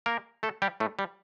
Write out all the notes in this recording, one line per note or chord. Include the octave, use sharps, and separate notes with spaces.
A#3 A#4
A3 A4
G3 G4
A2 A3
G3